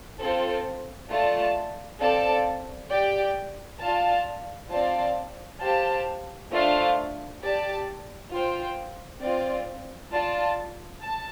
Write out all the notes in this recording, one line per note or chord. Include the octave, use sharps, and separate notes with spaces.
C4 F4 A4 C5
A3 F4 D5 A5
C4 A4 D5 F5 A5
G4 D5 G5
F4 D5 F5 A5
C4 F4 D5 F5 A5
G4 C5 F5 A5
A3 D4 F4 C5 F5
G4 D5 A5
F4 C5 G5
C4 F4 D5
F4 D5 A5
A5